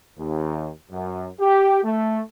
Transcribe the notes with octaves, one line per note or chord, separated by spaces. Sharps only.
D#2
F#2
G4
A3